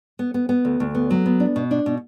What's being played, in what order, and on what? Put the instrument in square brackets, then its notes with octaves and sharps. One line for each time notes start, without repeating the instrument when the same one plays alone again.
[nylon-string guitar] B3
B3
B3
D2
D2
B3
F#3
B3
D4
B2
D4
B2